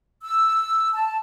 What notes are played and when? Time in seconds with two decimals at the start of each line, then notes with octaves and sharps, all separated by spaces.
0.24 E6
0.93 A5